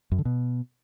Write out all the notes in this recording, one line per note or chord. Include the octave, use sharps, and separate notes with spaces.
F#2
D3
B2